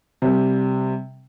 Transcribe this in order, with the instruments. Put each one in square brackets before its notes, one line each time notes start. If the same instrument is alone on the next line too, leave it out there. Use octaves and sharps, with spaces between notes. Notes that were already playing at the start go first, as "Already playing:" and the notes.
[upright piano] C3 G3